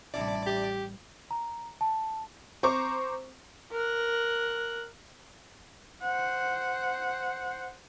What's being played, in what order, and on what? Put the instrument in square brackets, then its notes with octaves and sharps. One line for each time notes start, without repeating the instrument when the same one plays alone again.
[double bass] A1 G3 [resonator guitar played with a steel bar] C3 D4 E4 [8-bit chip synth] D5
[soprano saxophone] G4
[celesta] A#5
A5
[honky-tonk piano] C4 C5 A#5 C#6 D6
[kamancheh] A#4 F#6
[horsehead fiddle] C5 F#5